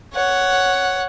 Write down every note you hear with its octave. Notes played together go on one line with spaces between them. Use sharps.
C#5 F#5